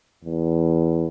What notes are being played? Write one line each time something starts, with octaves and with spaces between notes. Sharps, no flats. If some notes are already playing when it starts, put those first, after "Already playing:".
E2